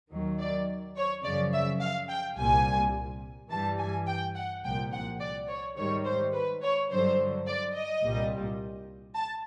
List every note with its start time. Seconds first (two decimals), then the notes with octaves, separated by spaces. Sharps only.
0.12 D#2 D#3 F#3
0.40 D5
0.97 C#5
1.24 F#2 C#3 F3 D5
1.53 E5
1.82 F5
2.10 G5
2.37 C2 A#2 G3 G#5
3.51 G2 E3 G3 A5
3.79 G#5
4.07 G5
4.36 F#5
4.64 C2 A#2 F3 G5
4.93 F#5
5.21 D5
5.48 C#5
5.77 G#2 D#3 G3 C#5
6.05 C5
6.34 B4
6.63 C#5
6.90 G2 D3 F#3 C5
7.47 D5
7.75 D#5
8.04 C2 A#2 G3
9.16 A5